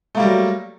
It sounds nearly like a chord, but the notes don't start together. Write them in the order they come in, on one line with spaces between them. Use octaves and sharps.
A3 A#3 G3 F#3